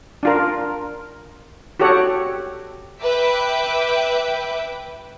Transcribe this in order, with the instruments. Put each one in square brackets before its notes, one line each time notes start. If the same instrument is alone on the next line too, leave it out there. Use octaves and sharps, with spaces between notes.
[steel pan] D4 F4 A#4
F#4 G4 A4 C#5 F#5
[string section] B4 E5 G5 D6